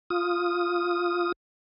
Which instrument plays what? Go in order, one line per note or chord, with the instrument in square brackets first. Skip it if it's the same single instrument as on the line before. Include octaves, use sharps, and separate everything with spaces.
[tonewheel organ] F4 D#6